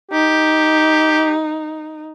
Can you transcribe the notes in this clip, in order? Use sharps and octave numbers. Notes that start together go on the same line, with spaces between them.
D#4 G4